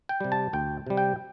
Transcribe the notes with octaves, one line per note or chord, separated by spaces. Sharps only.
G5
C3 G3
A5
D2 G5
C3 G3
G5